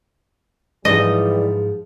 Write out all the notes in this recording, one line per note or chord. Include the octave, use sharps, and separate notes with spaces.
G#2 E3 F3 G3 D#4 G#4 D#5